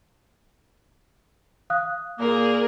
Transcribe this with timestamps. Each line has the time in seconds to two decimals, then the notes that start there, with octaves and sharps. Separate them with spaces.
1.70 F5 D#6 F#6
2.19 A#2 A#3 G#4 A#4